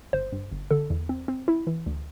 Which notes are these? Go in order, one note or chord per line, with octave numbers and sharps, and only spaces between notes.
G1 C5
G2
G1
D3 A4
E2
C4
C4
E4
E3
D2